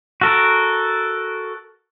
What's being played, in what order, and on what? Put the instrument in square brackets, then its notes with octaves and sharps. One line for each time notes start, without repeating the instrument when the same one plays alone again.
[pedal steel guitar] F#4 A4 A#4